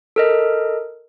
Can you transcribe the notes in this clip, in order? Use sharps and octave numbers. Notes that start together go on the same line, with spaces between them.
A4 A#4 D#5